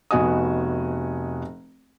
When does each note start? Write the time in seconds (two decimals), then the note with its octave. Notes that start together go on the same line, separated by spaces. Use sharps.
0.11 F1 B3 F#4 D#5 G#5 D#6